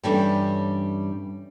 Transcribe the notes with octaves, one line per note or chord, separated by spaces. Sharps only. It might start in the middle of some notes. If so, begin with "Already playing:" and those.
G2 E3 G3 C#4 D4 A4